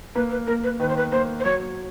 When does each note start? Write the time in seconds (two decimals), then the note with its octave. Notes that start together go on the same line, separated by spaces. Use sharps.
0.15 A#3 B4
0.31 B4
0.47 A#3 A#4
0.64 B4
0.80 D#3 B4
0.89 C5
0.96 B4
1.12 A#3 C5
1.40 C5
1.45 F#3 C#5